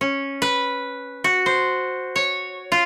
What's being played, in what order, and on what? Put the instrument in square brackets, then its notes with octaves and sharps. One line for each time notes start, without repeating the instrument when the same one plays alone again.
[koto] C#4
B4
F#4
C5
C#5
F4